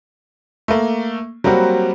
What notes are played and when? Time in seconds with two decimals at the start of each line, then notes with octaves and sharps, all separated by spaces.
0.68 A3 A#3
1.44 F#3 G3 A#3 C4 F#4